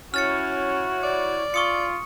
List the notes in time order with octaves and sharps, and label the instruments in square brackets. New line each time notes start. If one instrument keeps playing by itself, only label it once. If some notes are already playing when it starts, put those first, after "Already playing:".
[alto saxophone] C#4 [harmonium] E4 C#5 [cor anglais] F#4 [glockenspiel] F6 A6 C#7
[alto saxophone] D5
[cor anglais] F4 [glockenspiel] C#6 D#6 C#7